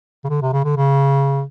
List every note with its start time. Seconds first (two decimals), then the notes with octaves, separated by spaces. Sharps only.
0.24 C#3
0.29 D3
0.42 C3
0.53 C#3
0.64 D3
0.77 C#3